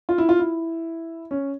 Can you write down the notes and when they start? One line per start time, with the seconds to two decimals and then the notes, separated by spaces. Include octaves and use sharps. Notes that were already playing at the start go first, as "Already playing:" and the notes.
0.09 F4
0.18 E4
0.29 F4
0.39 E4
1.31 C#4